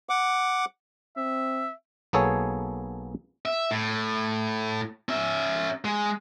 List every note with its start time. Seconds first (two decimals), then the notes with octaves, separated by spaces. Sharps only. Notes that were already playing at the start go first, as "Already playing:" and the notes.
0.09 F#5 D6
1.17 C4 E5
2.13 B1 A#3 B3 G#4 A4 C#5
3.45 E5
3.71 A2
5.09 C#4 E5
5.85 G#3